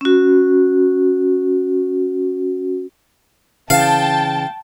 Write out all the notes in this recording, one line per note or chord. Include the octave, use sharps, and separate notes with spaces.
C#4 F#4
C#3 E3 F5 G5 A5